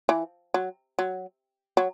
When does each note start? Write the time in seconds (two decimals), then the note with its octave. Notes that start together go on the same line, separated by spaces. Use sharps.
0.09 E3
0.54 F#3
0.99 F#3
1.77 F#3